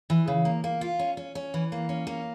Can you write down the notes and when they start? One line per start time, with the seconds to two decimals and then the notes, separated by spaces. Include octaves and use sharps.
0.10 E3
0.28 C#3
0.45 A#3
0.64 A#3
0.81 F4
0.99 C#4
1.17 C#4
1.35 C#4
1.54 E3
1.72 A#3
1.89 C#4
2.07 A#3